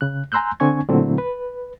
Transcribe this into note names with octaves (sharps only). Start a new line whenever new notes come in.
C#3 F#6
G#5 A#5 C6 E6 F#6 G6
D3 C4 D4 G#5 C#6 G#6
A#2 D3 F#3 A3 C4 E4
B4